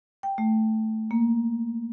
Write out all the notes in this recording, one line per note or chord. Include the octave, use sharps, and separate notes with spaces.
G5
A3
A#3